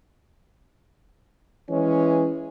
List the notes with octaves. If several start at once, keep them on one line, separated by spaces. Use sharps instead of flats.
E3 G#3 C#4